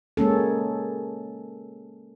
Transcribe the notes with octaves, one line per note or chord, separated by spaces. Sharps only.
G#3 A#3 C#4 A4